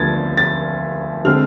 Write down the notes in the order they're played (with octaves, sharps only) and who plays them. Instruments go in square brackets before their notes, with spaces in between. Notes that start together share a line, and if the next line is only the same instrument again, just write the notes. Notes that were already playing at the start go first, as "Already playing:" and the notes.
Already playing: [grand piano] D2 D3 F3 B3 G#6 A6
A6
D3 G#3 C4 F6